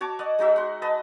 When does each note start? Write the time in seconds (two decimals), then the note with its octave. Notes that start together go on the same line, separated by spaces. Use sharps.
0.01 F#4 C#5 A5 D6
0.19 D5 D#5 F#5
0.39 G#3 D#4 F#4 E5
0.56 F#5 C6
0.82 B4 D#5 A5